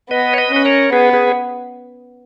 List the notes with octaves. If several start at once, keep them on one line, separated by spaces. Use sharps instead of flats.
B3 B4 D#5
C#5
B4 D#5
C#4 B4
A#4 C#5
B3 G#4 B4
G#4 B4